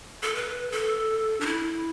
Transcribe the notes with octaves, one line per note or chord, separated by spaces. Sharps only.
A4
B4
A4
D4
E4